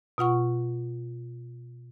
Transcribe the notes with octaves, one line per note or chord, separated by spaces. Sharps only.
B2 F4 F#5 C#6